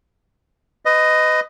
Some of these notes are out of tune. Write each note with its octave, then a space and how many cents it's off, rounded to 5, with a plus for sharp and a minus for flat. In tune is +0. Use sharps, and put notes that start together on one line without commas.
B4 +30 D#5 +0